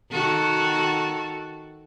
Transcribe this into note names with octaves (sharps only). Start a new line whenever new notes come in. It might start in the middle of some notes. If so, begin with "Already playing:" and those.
D#3 F#4 A4